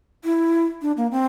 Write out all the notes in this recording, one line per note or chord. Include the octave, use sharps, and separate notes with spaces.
E4
D4
A#3
C4